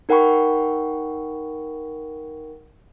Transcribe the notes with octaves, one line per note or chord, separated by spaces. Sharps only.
D#4 A#4 F#5 G5 B5 C#6